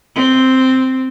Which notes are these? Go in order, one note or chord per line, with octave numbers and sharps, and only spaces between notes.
C4